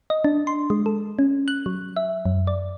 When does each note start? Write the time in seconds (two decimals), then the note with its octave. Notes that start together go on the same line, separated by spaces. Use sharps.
0.10 D#5
0.24 D4
0.47 C6
0.70 G#3
0.86 A4
1.19 C#4
1.48 F#6
1.66 F#3
1.96 E5
2.26 F#2
2.47 D5